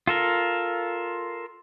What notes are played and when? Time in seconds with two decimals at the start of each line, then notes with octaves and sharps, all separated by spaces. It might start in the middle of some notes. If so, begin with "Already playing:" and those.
0.07 F4 A4 A#4